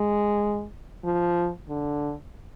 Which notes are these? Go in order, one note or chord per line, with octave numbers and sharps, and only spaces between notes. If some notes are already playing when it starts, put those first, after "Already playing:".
Already playing: G#3
F3
D3